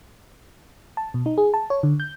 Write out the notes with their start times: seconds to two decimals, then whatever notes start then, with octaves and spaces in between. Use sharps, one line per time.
0.97 A5
1.14 B2
1.26 D#4
1.38 G#4
1.54 A5
1.70 C#5
1.83 D3
2.00 G6